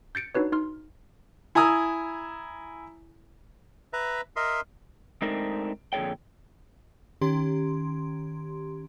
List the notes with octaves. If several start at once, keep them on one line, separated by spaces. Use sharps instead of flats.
G6 A6 C#7 D7
D4 D#4 F#4 B4 C#5
D#4 C6 F6
E4 G#5 A#5 D#6 E6
B4 E5 A#5
A#4 D#5 E5 C6
G#3 A3 C4 D4 D#4 A#4
F2 A#2 D3 G#4 C#5 G5
D#3 C#4 G4 C6